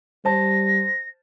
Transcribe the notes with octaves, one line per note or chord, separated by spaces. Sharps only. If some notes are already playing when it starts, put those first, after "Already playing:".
G3 C5 A5 A#6